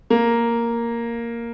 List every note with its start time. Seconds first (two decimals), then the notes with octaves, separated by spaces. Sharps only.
0.10 A#3